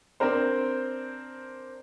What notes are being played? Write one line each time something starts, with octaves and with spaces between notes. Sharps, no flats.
C4 D4 A#4 C5